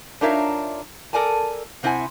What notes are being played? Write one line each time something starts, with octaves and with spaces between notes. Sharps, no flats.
D4 D#4 F4 A#4 C#5 E5
A4 A#4 D5 G#5 A5
C3 C4 E4 F#5 G#5